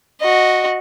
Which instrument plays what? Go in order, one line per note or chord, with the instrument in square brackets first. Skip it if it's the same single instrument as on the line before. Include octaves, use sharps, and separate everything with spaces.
[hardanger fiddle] F#4 D#5